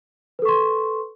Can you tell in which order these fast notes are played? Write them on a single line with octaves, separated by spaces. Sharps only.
B4 A4 C#6 C6